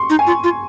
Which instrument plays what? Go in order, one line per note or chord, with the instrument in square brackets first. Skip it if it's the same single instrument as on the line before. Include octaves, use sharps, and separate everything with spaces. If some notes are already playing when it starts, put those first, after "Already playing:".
Already playing: [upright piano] C6 C#6
[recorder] D#4
[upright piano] G#5
[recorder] F4
F4